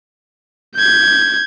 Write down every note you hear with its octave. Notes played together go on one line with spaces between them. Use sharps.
G6 G#6